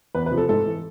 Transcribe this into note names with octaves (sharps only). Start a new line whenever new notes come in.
E2 B4
B4
C3 F3
A4
G#2 A4
E3